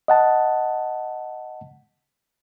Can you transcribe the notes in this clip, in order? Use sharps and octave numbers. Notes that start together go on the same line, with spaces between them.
D#5 F#5 A5